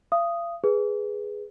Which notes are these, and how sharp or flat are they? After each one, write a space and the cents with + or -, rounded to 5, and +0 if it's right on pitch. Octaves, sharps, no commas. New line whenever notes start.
F5 -40 D#6 +0
G#4 +0 B4 +0